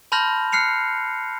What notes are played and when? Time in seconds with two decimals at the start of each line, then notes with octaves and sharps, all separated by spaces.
0.12 A5 B5 C6 F6 G6 A#6
0.52 F6 F#6 C7 C#7 F7